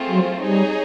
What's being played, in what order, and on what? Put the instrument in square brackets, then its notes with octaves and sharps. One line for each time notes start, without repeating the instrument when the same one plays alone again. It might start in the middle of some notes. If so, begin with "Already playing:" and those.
Already playing: [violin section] A3 C4 F4 G#4 C5
[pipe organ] F#3
[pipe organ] G3 [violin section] D#4 G#4 C#5